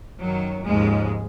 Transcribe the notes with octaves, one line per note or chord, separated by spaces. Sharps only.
F#2 D#3 F#3
D#2 G#2 C#3 F3 G#3